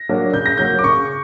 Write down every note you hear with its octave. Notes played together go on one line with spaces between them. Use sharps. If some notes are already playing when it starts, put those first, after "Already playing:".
Already playing: A#6
F#3 A#3 D4
C#3 G6
A#6
F#3 A#3 G6
D6
C#3 C#6